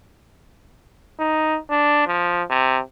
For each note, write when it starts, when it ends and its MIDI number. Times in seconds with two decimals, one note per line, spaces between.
1.19 1.58 63
1.70 2.05 62
2.07 2.43 53
2.50 2.79 48